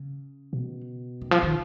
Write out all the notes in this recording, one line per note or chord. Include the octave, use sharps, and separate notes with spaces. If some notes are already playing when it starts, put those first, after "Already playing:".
Already playing: C#3
B2
D#3
F3
D#3